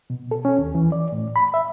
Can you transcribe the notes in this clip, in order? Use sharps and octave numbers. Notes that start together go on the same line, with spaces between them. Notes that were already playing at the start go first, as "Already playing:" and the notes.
B2
A4
C#4
D#2
E3
D5
A2
B5
E5